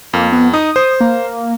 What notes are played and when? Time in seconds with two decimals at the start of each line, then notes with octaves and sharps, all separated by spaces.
0.13 F2 A#3
0.32 B3
0.54 D#4 D#6
0.76 C5
1.00 A#3